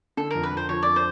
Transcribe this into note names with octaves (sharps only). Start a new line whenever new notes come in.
D3 A4
F2 A#4
B4
F2 C5
F3 C#5
D5
C5